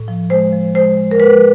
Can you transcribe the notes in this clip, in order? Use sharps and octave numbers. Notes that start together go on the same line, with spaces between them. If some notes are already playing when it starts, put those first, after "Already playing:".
Already playing: A2
F3
G#3 C5
F3
G#3 C5
G#3
A#4
G#3 B4